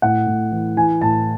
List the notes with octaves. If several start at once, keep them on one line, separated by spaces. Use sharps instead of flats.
A2 F#5
A2
E3
E3 G#5
A2 A5